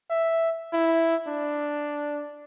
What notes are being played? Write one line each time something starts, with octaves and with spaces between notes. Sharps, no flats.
E5
E4
D4